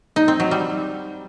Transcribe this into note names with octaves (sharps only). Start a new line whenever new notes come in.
D#4
C4
F#3
G3